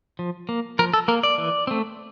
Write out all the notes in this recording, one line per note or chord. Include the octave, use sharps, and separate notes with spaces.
F3
A#3
F3 A#4
A4
A#3 A#4
D5
E3
A3 C4